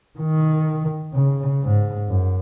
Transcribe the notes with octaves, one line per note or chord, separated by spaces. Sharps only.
D#3
C#3
G#2
F#2